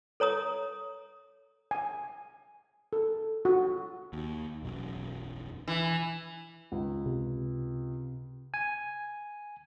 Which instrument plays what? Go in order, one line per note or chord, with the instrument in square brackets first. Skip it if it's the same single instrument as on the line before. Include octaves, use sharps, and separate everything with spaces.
[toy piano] A4 C#5 A#5 D#6
[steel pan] G#5
A4
F#4
[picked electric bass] D#2
E1 B1 F#2
[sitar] E3
[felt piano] C#2
[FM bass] C3
[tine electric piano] G#5